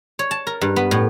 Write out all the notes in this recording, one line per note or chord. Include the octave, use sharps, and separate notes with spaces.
C#5
A5
A#4
G2
B3
A2